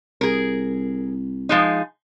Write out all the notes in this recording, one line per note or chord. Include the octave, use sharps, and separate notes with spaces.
C2 G#4 A#4
F3 G#3 D#4